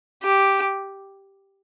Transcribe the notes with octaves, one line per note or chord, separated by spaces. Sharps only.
G4